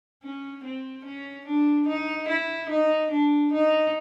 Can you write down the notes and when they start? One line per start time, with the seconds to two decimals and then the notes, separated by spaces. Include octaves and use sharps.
0.23 C#4
0.64 C4
1.05 C#4
1.46 D4
1.88 D#4
2.29 E4
2.69 D#4
3.11 D4
3.53 D#4